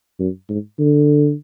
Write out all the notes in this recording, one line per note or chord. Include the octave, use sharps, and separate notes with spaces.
F#2
G#2
D3